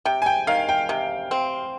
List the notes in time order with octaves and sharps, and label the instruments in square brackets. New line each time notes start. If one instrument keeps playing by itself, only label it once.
[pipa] C3 [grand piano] G5
[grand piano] G#5
G5
[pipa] D#3 [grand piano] F5
[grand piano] G5
[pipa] C3
C4